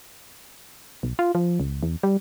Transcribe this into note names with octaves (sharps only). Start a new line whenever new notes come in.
B1
F4
F3
C#2
E2
G3